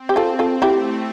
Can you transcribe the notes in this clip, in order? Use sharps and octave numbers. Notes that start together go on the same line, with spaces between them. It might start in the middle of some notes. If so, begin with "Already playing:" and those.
Already playing: C4
G4
F4 A4
C4
F4 A4
A3 E4 G4